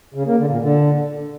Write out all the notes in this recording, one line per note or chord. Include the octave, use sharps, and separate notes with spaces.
C#3
A#3
D3
A#2
D3